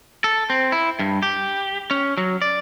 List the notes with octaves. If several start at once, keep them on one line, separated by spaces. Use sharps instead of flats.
A4
C4
E4
G2
G4
C#4
F#3
D5